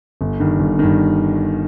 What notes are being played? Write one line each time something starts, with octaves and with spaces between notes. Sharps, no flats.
G1
G2 D#3
G1
G2 D#3